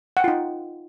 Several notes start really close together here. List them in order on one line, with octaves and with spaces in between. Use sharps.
F#5 G5 F4 D#4